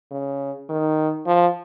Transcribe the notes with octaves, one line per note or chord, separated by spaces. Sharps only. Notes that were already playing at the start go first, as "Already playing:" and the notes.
C#3
D#3
F3